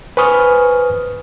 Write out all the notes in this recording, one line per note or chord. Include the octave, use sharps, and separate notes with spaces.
B4 C5 G#5 C#6 D#6 F6